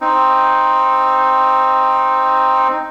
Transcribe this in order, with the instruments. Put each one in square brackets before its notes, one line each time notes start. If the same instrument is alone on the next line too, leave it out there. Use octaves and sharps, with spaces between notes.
[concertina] C4 D#4